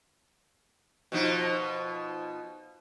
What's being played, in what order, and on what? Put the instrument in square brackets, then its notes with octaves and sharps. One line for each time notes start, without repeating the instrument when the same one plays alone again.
[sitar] B2 F3 D#4